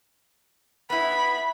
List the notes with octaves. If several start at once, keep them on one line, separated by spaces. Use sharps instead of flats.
B3 E4 B5